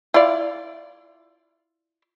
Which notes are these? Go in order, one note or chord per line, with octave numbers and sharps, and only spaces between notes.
E4 F4 D5